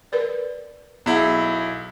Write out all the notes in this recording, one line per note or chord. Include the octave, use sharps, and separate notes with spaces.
A#4 B4 D5
B1 B3 E4 G#4 F#5